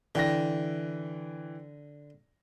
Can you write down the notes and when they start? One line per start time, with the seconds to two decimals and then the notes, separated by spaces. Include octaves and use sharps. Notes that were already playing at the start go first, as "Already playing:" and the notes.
0.15 D3 E3 G5 A#6